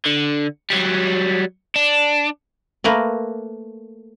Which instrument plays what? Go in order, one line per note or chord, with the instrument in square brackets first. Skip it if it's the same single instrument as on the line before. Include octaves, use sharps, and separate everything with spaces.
[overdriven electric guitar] D3
F#3 G3
D4
[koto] A3 A#3 A#4 B4